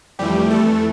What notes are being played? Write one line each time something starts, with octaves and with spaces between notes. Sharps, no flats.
F2 E3 G3 A3 G4
A3 A4